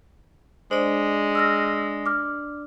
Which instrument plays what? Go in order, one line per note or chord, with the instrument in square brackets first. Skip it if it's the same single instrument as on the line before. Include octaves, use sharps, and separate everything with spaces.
[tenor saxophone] G#3 [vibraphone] D4 D5 [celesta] C5
[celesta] E6 F6 A#6
D6 F6